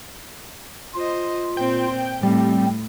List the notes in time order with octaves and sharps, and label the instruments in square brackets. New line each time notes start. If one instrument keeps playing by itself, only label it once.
[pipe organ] F4 [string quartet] C5 D#5
[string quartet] A#2 C4 [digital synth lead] G5
[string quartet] A2 [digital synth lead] G3 [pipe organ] C4